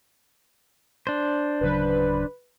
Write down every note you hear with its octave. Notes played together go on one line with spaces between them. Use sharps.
D4 C5
D1 C#3 F#3 B4